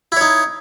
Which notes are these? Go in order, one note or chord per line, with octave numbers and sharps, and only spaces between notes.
D#4 E4 C#5